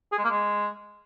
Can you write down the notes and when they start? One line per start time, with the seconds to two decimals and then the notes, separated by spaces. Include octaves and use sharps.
0.12 G#4
0.18 G#3
0.24 A#3
0.30 G#3